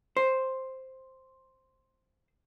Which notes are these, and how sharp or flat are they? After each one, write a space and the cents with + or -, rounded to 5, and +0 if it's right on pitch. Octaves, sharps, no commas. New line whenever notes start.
C5 +5